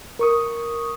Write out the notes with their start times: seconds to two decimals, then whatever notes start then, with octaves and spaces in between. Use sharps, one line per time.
0.19 A#4 C#6 D#6